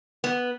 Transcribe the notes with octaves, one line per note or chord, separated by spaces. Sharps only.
B3